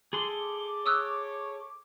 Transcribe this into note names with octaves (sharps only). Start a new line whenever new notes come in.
G#4 A4 C6 D6
C#5 D#6 E6 F#6